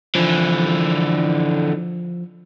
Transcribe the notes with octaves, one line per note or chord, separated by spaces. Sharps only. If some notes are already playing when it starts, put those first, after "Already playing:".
D3 E3 F3